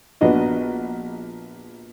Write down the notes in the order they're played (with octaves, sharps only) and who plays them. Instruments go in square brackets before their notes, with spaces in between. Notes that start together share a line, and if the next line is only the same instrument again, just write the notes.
[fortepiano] A#1 B3 D4 F#4 D#5